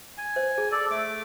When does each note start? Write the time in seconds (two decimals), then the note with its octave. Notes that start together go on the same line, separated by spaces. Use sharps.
0.18 G#5
0.36 C5
0.58 G#4
0.72 A4 D5
0.91 A3 D6